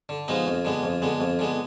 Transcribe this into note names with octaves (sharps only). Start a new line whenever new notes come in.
D3
F3 G#3 B3 D#4
F2
D3 G#3 B3
F2
D3 G#3 B3
F2
D3 G#3 B3